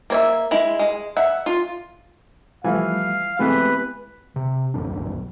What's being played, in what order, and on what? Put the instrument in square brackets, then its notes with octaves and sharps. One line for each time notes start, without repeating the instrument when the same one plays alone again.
[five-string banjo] A#3 C#5 E5
G#3 E4
G#3
E5 F#5
F4
[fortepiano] E3 [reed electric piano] F3 G3 A3 [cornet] F5
[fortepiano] C3 E3 B3 [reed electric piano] G#3 A3 G4 [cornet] B4
[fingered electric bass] C3
D1 B1 F#2 D4